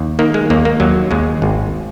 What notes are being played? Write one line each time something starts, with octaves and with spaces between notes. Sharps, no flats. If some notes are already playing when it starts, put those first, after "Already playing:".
Already playing: D#2
D#3 A#3
G#3
D#2 A#3
A#3
D#2 F#3
D#2 G#3
G#1